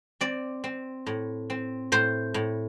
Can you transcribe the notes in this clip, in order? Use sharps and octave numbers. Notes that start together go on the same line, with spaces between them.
C4 D5
C4
A2
C4
A2 C5
A2